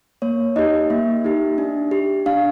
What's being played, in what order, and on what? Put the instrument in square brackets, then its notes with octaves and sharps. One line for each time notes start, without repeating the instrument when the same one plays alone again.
[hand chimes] A#3 C#5
D#4 G4 D#5
A#3 E5
D#4 G4
D4
G4
D4 F5